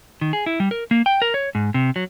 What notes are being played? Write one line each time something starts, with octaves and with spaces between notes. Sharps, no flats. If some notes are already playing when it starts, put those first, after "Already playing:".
D#3
G#4
E4
G3
A#4
A#3
G5
A#4
C#5
G#2
C3
F#3